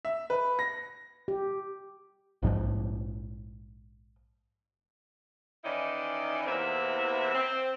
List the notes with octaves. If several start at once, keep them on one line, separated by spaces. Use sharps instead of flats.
E5
B4
A#6
G4
A#1 G#2 B2 F3
D#3 E3 C#4 D#4 E4 D5
E2 C3 E3 A#3 C4 E5
C4